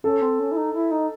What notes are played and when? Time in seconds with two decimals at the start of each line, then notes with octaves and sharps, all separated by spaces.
0.04 C#4 A4
0.21 C4
0.39 C#4
0.51 E4
0.56 D#4
0.73 E4
0.91 D#4